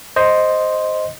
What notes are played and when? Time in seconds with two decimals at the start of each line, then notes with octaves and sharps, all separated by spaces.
0.16 C5 D#5